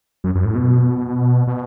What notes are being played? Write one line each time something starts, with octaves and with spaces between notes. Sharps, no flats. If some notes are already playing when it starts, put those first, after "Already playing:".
F#2
F#2
A2
B2
B2